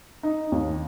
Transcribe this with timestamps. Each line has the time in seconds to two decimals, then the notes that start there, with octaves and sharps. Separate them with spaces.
0.23 D#4
0.52 D#2